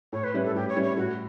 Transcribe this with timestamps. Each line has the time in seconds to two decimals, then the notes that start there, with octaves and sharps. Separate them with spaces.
0.13 A2 C#5
0.24 B4
0.34 G3 C#4 E4 B4
0.45 A4
0.55 A2 G4
0.69 C#5
0.76 G3 C#4 E4 B4
0.84 C#5
0.97 A2 F#4